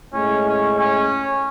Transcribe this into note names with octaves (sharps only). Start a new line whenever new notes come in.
A2 G#3 C#4
C#4
C#4